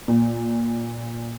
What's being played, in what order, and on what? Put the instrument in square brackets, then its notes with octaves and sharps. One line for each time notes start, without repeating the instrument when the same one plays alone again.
[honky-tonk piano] A#2